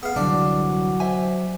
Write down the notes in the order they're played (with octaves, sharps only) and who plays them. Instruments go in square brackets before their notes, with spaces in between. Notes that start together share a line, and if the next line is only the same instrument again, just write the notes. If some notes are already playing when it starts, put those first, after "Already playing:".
[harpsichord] B3 F5 [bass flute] G#4
[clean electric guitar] C2 D3 E3 [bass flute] F#3 [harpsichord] D4
[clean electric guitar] C5 E5 G#5